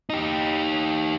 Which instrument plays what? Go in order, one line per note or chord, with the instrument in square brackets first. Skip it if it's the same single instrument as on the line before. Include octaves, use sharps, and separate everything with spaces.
[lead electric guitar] D#4 G4